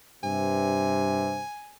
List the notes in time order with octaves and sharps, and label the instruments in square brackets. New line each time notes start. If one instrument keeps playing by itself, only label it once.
[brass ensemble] G2 C3 [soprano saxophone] G#5